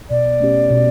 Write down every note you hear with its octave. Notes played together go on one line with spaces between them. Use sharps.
B2 D5
A3 C#4 G4
B2